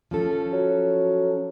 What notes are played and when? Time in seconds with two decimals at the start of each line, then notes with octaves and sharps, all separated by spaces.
0.11 F3 C#4 A4
0.52 F#3